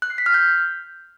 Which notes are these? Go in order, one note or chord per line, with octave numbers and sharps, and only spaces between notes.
F#6
C7
B6
F6
G6